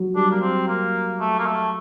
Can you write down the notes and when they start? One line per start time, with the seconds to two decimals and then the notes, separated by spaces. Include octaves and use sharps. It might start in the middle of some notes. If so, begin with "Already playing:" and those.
Already playing: F#3
0.16 G3 D4
0.31 A#3
0.41 C4
0.67 A#3
1.20 A3
1.39 A#3
1.46 A3